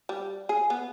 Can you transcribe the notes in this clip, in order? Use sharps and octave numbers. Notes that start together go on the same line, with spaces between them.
G3
G#4
B3